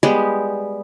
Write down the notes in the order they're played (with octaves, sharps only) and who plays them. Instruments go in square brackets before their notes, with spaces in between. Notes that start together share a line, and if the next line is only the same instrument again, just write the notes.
[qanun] G3 G#3 B3 G4